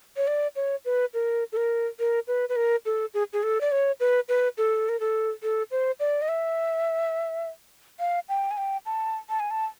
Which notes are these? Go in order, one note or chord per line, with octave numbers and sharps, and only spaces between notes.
C#5
D5
C#5
B4
A#4
A4
A#4
A#4
B4
B4
A#4
A4
G#4
G#4
A4
D5
C#5
B4
B4
A4
A#4
A4
A4
C5
D5
D#5
E5
F5
G5
G#5
G5
A5
A5
G#5
A5